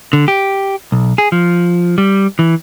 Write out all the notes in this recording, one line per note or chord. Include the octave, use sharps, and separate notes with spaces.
D3
G4
B1
G#4
F3
G3
E3